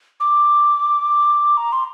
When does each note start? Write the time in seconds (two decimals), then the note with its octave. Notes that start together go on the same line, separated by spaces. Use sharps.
0.20 D6
1.57 A#5
1.72 C6